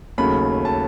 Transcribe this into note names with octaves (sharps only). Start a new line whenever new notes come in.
D#2 C#3 F#3 A3 B5
A5